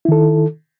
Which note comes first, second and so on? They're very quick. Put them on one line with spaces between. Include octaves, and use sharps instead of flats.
E4 D#3 A4